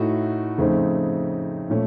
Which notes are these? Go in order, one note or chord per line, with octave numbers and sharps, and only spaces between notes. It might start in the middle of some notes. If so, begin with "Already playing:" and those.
Already playing: A2 A3 D#4 F#4
F2 C#3 A3 C4 D#4
A#2 A3 C#4